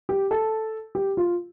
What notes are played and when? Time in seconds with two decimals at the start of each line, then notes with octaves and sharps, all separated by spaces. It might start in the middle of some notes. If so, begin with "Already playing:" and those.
0.09 G4
0.31 A4
0.95 G4
1.17 F4